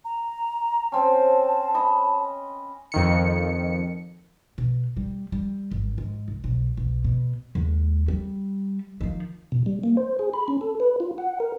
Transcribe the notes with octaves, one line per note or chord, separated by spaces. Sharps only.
A#5
C4 C#4 A5
D#5 B5
F2 D#3 C#7
B2
G3
G3
G#1
G#2
C2
B1
B1
B2
D#2 G#3
G3
D#3 F3
B2
G3
A#3
C5
G#4
B5
C#4
A4
B4
F4
F#5
A#4